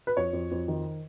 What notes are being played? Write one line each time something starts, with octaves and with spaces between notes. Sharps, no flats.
B4
F2 C#5
F2
F2
D#3